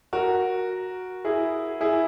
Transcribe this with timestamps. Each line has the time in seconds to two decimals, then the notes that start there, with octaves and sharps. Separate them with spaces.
0.13 F#4 A#4
1.25 E4 G#4
1.81 E4 G#4